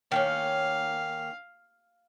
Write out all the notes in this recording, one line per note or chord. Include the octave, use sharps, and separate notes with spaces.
D#3 A#3 C#4 F5